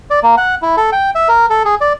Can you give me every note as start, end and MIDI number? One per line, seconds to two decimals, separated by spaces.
0.10 0.20 74
0.23 0.35 58
0.37 0.55 78
0.62 0.76 64
0.77 0.90 69
0.92 1.10 79
1.15 1.28 76
1.28 1.46 70
1.50 1.63 69
1.65 1.75 68
1.81 1.93 74